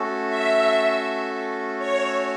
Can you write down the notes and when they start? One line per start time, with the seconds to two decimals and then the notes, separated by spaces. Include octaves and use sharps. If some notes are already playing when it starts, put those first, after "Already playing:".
Already playing: A3 C#4 F#4 A4
0.29 E5
1.79 C#5